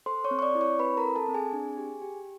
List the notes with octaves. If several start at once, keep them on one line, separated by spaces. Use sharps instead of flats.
A4 C5 C6
C#5 C#6
C4
C#6
D5 D6
E4
C#5 C#6
C4 B4 B5
A#4 A#5
A4
A4 A5
C4
G#4 G#5
D4
G4
G4